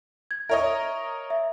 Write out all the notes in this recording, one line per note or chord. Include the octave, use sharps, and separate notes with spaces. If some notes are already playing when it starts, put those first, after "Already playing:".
G#6
A#4 C#5 D#5 E5
E5